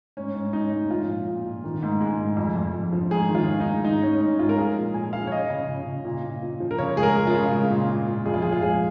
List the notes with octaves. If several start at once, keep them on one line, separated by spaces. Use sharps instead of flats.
G#2 C#4
G#2
G#2 D#4
G#2
F3 F4
A#2
A#2
A#2
D#3
G#2
G#3
G#2
F2
F2
F2
F3
G#2 G#4
D#3
F4
G#3
D#4
G#2
G#2 D#4
G#2 C#4
G#2 D#4
G#2 F4
A#4
F3 G#4
A#2
A#2 G#5
F3 F5
C#5
F3 D#5
C#3
C#3
C#3
A#2
A#2
A#2
F3
A#4
C#3 C#5
G#3 G#4
A#4
G#3
F4
C#3
G#3
A#2
A#2
A#2
F2 G#4
F4
F2 G#4
F4
G#3 G#4